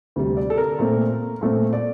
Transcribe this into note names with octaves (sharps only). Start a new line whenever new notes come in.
D2 C3 G3
D5
A4
A#4
A#2 A3 C4
A#2 A3 C4
D5